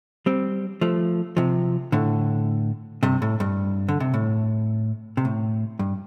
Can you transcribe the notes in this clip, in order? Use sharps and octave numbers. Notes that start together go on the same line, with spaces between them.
G3 C4
F3 A3
C3 F3
A2 D3
G2 C3
A2
G2
D3
C3
A2
C3
A2
G2